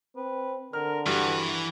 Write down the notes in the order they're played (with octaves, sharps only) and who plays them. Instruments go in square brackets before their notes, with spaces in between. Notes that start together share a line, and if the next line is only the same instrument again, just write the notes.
[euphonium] C4 [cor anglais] B4
[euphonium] D3 [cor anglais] A#4 [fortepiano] F6
[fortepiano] G2 [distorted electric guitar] E3 B4 [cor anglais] F#4